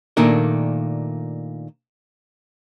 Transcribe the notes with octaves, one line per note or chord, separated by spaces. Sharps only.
A#2 D#3 A3 A#3 D4 A#4